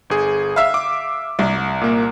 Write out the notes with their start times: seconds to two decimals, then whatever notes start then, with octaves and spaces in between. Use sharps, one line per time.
0.10 G1 G#4
0.56 E5 F5
0.74 D6
1.39 C2
1.81 A#2 A#3